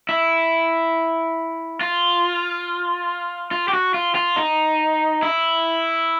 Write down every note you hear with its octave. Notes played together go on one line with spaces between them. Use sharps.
E4
F4
F4
G4
F#4
F4
F4
D#4
E4